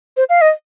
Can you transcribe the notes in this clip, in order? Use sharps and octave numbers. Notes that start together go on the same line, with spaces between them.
C5
F5
D#5